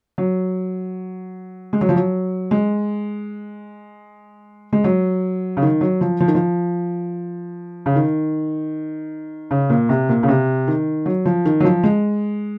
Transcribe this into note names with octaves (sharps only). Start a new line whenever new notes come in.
F#3
G#3
F#3
F3
F#3
G#3
G#3
F#3
C#3
D#3
F#3
F3
F3
D#3
F3
C#3
D#3
C#3
A#2
C3
A#2
C#3
C3
D#3
F#3
F3
D#3
F#3
F3
G#3